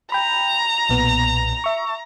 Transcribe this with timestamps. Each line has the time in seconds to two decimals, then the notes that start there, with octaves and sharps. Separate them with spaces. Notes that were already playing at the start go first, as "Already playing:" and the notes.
0.12 G5 A#5 B5
0.89 B1 A#2 B3
1.64 E5 C#6